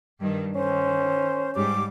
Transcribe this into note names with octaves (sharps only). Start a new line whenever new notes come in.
G2 D#3
D#3 C#4 C5
G#2 G3 D6